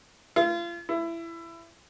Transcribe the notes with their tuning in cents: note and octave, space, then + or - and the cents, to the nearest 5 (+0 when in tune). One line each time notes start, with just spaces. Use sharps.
F4 -35
E4 +20